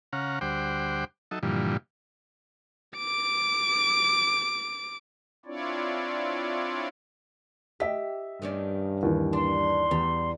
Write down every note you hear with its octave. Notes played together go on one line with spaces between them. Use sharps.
C#3 C#4 F5 F#5 A#5
D2 G3 C5 F#5 G5 D6
F#3 D#4 A4 E5
G2 A#2 D3 E3 F3 G3
D6 D7
C4 D4 E4 F4 C#5 D5
G4 D#5 E5 B6
G2 D#3 C#4 D4
D#2 E3
D4 C6
E2 G3